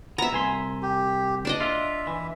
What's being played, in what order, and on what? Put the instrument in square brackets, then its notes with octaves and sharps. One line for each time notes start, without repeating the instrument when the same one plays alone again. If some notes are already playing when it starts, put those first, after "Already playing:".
[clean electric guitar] B3 [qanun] E5 A#5
[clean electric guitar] C2 G#5 C6
[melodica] G4
[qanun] D4 D5 D#5
[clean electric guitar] F4 [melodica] E5
[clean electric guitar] E3